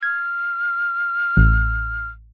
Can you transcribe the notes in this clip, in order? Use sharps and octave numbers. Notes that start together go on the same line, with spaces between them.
F6 G#6
A1